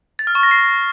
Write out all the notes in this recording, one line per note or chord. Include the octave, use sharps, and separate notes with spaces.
A6
F6
C#6
A#6
C7